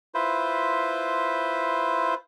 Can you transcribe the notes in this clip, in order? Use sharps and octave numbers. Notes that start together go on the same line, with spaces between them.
E4 F4 B4 C5